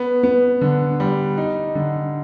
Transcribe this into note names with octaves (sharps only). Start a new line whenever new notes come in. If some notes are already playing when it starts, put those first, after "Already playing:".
Already playing: B3
B3
D3
G3
D#4
D3